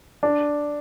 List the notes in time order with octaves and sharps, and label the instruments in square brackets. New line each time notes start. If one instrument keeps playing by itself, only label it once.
[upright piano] D4